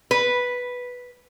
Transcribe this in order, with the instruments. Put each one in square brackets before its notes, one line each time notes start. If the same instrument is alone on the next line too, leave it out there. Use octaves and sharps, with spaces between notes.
[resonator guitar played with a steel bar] B4